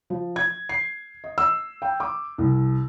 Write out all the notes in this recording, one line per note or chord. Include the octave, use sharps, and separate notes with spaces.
F3
G#6
C7
D#5
E6
G5
D6
C2